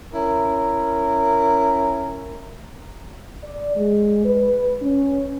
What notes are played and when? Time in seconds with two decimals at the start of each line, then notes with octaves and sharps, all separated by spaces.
0.14 C#4 E4 A#4
3.43 D5
3.76 G#3
4.25 B4
4.82 C#4